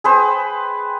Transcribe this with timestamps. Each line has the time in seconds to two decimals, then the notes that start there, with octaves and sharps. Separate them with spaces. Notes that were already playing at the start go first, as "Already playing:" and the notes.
0.04 G#4 B4 C5 G5